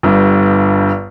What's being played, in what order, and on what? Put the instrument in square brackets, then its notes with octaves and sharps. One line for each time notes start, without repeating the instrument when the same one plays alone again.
[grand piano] G1 G2